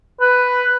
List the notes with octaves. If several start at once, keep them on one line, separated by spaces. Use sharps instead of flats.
B4